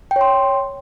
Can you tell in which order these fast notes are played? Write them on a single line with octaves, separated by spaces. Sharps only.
G5 C#5 C6